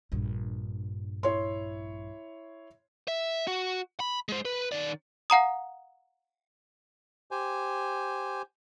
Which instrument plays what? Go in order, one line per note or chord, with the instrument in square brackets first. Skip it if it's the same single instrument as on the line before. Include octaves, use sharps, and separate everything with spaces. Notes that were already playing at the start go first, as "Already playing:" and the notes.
[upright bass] A#1 G2
[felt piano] E4 C#5 C6
[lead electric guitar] E5
F#4
B5
G#3 C5
B4
D#3 D5
[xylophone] F5 F#5 A#5 D#6
[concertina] G4 C5 G#5